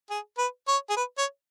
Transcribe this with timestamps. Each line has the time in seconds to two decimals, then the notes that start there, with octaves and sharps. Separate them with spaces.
0.10 G#4
0.38 B4
0.68 C#5
0.90 G#4
0.96 B4
1.18 C#5